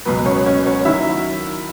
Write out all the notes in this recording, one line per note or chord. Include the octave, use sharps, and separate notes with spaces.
C#2 B2 F#3 B4
C#4 C#5
C#4 C#5
C#4 C#5
D#3 F#3 E4 E5